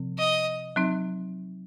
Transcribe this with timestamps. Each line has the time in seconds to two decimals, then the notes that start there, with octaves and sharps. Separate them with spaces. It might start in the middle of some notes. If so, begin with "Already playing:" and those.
Already playing: C3 F3 C4
0.18 D#5
0.76 F#3 C4 D#4